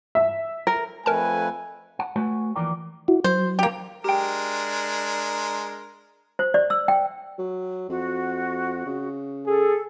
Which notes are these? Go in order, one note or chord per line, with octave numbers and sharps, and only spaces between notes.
E5
A#4
F2 A3 A#4 B4 G#5 A5
F#5
A3 F#4 B4 C#5 F#5 G#5
D#2 E3 F3 A#4 D5 G5
E4 F#4
F#3 C5
A#3 G4
G#3 D4 G4 A#4 G5
C5
D5
E6
G5
F#3
F2 F#4
C#3
G#4 A4